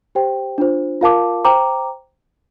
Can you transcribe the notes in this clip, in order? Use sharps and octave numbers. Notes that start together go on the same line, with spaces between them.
G4 C5 G5
D4 F4 C5
F4 A#4 F5 A5 D6
C5 G5 A#5 D6